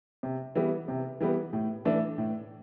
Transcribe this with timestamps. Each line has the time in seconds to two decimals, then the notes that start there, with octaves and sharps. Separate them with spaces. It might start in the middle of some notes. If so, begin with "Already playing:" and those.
0.23 C3
0.55 E3 G3 B3
0.88 C3
1.21 E3 G3 B3
1.53 A2
1.85 E3 A3 D4
2.18 A2